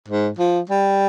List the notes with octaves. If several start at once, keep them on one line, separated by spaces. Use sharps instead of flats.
G#2
F3
G3